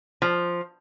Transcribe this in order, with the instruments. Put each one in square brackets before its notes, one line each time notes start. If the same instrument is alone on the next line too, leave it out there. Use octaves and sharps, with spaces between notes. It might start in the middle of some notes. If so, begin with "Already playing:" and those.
[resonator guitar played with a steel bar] F3